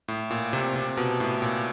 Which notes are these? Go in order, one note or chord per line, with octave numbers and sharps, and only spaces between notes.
A2
A#2
C3
C3
B2
A2
A#2